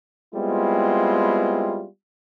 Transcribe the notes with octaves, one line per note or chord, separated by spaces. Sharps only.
G3 G#3 B3 C4 E4 F4